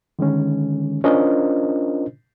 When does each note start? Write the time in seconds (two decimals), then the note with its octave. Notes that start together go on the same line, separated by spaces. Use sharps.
0.19 D3 D#3 G#3 C#4
1.04 C#4 D4 F4 A#4 C5 D#5